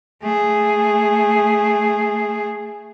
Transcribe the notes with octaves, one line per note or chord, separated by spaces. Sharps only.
A3 G#4